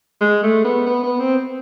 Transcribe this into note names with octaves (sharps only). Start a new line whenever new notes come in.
G#3
A3
B3
B3
B3
C4